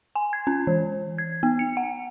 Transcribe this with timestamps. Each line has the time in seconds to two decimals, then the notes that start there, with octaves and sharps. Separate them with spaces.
0.16 G#5
0.33 G#6
0.47 C#4
0.67 E3
1.18 G#6
1.43 B3
1.59 C#7
1.77 F#5